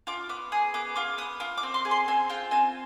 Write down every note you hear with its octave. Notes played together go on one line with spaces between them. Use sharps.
F4 D6
B3 D6
G#4 D#6
B3 D6
F4 D6
B3 D#6
F4 D6
D6
C4
C6
G#4
C6
C4 G#5
F4 G5
C4 G#5